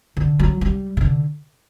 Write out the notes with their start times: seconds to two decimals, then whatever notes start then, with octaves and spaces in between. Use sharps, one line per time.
0.17 D3
0.39 F#3
0.61 G3
0.97 C#3
1.01 D3